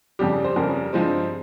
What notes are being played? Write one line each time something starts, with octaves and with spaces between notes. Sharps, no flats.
F2 C#3 G3 G4
C5
F2 C#3 G3 A#4
G2 F3 G#3 C4